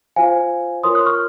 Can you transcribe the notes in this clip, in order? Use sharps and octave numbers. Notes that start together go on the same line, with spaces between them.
F4 C5 F5 G#5
F4 A#4 C#5 C6 D#6
D#6 F#6
C#6 F6